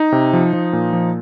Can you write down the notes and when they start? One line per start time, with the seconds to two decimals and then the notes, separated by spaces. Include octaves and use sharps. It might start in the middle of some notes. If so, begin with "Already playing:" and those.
Already playing: D#4
0.12 C3
0.33 F3
0.53 F3
0.73 A#2
0.93 F3